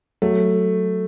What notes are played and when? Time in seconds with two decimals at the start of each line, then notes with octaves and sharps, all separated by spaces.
0.22 F#3 A3